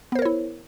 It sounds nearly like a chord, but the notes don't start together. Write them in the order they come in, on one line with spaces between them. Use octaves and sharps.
B3 C5 A#4 C#5 E4